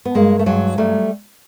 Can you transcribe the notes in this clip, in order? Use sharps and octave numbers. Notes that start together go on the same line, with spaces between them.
B3
G2 G#3 A#3
A3
G2 F#3 G#3
F#3 G3 A3